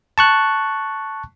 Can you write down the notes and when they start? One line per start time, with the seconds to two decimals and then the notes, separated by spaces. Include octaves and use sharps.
0.18 A5 C#6 F#6